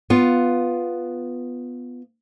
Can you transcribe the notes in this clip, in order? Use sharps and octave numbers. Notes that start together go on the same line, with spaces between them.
B3 F4